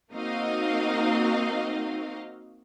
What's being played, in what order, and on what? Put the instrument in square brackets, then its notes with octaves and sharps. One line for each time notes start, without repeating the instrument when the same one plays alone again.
[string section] A#3 C4 D#4 F#4 D#5 F5